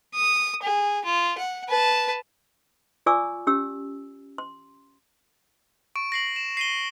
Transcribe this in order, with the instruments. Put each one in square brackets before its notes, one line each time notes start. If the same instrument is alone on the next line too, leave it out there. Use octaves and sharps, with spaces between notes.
[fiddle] D#6
G#4
F4
F#5
B4 A5
[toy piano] F4 D5 G#5 C#6 D6 E6
C#4 G4 E6
C6
[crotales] C#6 D7
A#6 C7 F#7
E7
C7 D#7 G7